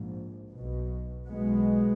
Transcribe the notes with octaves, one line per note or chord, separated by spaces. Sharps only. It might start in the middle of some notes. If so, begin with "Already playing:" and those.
Already playing: A#1 G#2
B1 B2
B1 B2 G#3 B3